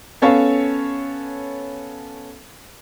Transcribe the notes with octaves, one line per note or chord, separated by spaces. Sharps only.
B3 C#4 A4 C#5 F5